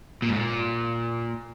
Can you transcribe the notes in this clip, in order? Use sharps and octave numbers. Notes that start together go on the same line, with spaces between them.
A#2
G#2
A#2